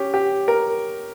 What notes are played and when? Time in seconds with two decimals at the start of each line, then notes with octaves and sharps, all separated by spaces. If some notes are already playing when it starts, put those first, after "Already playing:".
Already playing: C#4 G4
0.14 G4
0.48 A#4